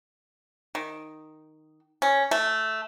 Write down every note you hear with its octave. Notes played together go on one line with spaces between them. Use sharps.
D#3
C#4
A3